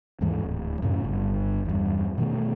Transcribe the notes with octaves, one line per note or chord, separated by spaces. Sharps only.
D#2 G#2 E3
D1
F#2 A2 C#3 C#4
G1
E2 G2
B2 D#3 A3